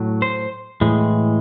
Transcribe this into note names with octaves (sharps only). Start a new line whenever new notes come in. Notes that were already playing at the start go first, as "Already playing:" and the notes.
Already playing: A2 F#3
C5
A2 E3 G#3